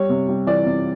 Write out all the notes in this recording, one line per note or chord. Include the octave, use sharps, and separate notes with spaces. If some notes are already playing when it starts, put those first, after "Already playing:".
Already playing: G3 C#5
C3
G3
E3 D5
C3